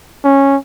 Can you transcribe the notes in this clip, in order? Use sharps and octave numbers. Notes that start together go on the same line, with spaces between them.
C#4